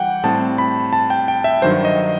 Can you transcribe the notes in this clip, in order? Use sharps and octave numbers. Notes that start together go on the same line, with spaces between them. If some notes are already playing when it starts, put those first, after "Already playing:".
Already playing: E3 G3 F#5 G5
A2 G3 C4 A5
B5
A5
G5
G5
E5
G2 D#3 F#3 C5
D#5